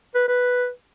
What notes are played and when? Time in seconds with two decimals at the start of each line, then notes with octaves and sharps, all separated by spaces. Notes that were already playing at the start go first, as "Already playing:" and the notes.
0.15 B4
0.28 B4